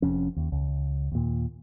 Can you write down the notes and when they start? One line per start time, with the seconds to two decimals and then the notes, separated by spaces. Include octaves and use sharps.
0.02 F1 F2 C#4
0.37 D#2
0.52 C#2
1.12 D#2 A#2